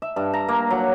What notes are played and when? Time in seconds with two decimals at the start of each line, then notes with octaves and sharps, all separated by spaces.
0.02 E5
0.16 G2
0.33 A#5
0.48 A#3
0.71 F#3